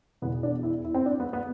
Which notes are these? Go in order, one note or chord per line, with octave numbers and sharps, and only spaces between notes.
E2 B2 B3
D4
E4
E4
C4
D4
B3
B3